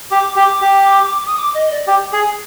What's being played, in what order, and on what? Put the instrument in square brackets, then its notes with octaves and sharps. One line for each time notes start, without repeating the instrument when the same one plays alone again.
[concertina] G4 [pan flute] D6
[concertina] G4 [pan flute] D6
[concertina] G4
[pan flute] D#6
D6
D#5
D5
[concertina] G4
G#4